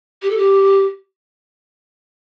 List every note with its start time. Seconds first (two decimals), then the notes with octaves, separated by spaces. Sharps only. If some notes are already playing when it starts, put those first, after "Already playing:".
0.22 G4
0.30 A4
0.37 G4